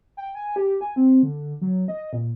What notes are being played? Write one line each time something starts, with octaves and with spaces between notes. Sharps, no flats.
G5
G#5
G4
G#5
C4
D3
F#3
D#5
A#2